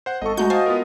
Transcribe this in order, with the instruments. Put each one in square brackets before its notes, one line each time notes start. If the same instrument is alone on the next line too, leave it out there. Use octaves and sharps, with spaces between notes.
[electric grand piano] C5 F#5
[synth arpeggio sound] G#1 [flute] A4 [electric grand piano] D#5 C#6
[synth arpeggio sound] G#3 A3 G6 [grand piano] F#4 [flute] A#5
[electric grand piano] C5 F5 A5 [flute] D#5 [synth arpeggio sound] G#5
[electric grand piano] B3 F4 A#4